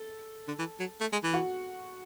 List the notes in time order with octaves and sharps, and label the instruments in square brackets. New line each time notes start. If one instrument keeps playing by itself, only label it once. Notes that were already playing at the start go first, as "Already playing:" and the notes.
Already playing: [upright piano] A4
[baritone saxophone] D3
E3
F#3
A3
G#3
E3
[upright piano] F#4